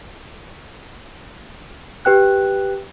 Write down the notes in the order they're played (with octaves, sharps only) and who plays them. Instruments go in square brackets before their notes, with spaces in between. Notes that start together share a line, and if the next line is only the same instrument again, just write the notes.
[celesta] G4 B4 G5 F#6